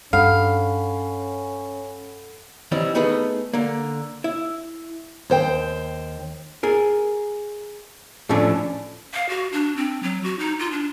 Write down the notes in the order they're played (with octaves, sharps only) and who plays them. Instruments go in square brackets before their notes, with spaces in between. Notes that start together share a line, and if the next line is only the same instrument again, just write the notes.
[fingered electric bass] G2 [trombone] C#4 [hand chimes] A4 F#5 B5 [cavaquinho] F5
[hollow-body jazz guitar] D#3 E3 G3 C4 E4
A3 B3 D#4 G#4 B4
D3 A#3
E4
[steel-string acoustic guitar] D#2 C5 G5
[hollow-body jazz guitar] G#4 A#4
A2 F3 A3 C#4 D4
[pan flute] F5
F#4
D4
C4
F#3
F#4
D#4
F4
D4